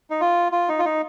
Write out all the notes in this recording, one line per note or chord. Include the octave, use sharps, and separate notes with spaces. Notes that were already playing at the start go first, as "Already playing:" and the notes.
D#4
F4
F4
D#4
F4
D#4